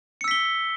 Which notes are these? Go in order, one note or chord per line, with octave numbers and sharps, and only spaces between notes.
E6 B6 C#7 G7